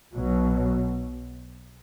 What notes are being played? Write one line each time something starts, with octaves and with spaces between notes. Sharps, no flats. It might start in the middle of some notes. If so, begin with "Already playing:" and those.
B1 B2 F#3